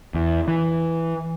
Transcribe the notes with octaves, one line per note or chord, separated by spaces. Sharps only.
E2
E3